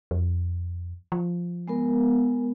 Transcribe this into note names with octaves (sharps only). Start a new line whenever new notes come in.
F2
F3
G#3 B3 A#4